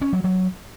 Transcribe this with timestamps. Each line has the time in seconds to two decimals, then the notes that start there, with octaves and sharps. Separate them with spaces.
0.01 C#4
0.13 F#3
0.24 F#3